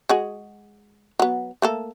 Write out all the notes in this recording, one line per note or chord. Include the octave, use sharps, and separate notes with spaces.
G#3 F#4 G#4
F#3 B3
A3 A#3 A4